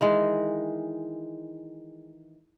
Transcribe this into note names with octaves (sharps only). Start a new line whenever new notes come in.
D#3 E3 G#3